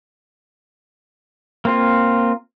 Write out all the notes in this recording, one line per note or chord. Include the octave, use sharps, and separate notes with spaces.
A#3 C4 F4